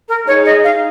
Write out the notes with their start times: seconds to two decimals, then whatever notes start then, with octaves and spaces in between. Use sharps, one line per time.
0.08 A#4
0.26 D#4 G#4 C#5
0.45 D#5
0.64 F5